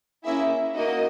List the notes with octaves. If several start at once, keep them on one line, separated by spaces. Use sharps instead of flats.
A#3 C#4 E4 G#4 E5
A#3 D#4 F#4 D#5